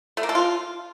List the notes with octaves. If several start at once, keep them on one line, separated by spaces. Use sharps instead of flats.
A3
A#3
A4
F4